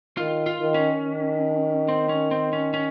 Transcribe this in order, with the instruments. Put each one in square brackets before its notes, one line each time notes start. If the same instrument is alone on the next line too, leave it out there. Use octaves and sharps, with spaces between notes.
[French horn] D#3 [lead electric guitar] F4
[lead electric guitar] F4
[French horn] D#3
[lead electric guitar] C#4
[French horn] D#3
[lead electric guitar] C4
C#4
C4
C#4
C#4